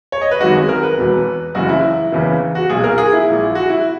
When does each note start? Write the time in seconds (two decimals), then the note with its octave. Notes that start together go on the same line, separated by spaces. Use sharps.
0.12 C#5
0.21 D#5
0.31 B4
0.40 G#1 F#2 D#3 F#4
0.55 G#4
0.69 A#4
0.83 B4
0.98 E1 E2 B2
1.55 F#1 F#2 C#3 E3 F#4
1.69 E4
2.12 F#1 E2 C#3 E3
2.55 F#4
2.70 B1 A#2 G#4
2.84 A#4
2.98 G#4
3.13 E4
3.27 A#1 A#2
3.55 F#4
3.70 E4